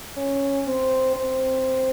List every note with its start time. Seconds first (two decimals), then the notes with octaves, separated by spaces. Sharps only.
0.17 C#4
0.67 C4
1.16 C4